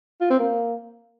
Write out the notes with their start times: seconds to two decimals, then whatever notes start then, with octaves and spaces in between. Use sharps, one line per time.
0.21 F4
0.30 C4
0.39 A#3